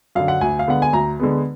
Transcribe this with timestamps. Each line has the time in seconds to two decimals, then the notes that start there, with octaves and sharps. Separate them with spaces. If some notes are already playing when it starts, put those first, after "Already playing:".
0.15 F#2 D3 F5
0.28 F#5
0.41 D2 G#5
0.59 F5
0.67 D3 G#3 B3 F#5
0.82 G#5
0.93 D2 A#5
1.20 D3 G#3 B3